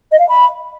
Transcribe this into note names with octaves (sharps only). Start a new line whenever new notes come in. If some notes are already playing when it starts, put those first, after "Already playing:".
D#5
F5
B5